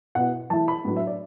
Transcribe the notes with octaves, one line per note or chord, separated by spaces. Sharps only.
B2 B3 E4 F#5
E3 A3 E4 A5
B5
A2 F#3 B3 D4
E5
D5